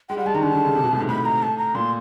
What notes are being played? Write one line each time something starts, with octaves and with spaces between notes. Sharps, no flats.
G#3 G5
G3 F#5
G#3 A5
D#3 A#5
D3 A5
D3
C#3
C3
B2
A2
G#2
A2 B5
A#5
A5
A#5
A#2 C6